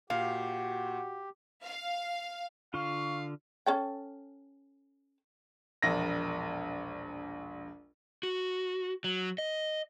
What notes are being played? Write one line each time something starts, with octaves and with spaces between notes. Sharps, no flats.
A#2 F#4 G4 F5
F5
D3 F4 F5 C#6
C#4 A4 G5
E1 A#1 A#6
F#4
F#3
D#5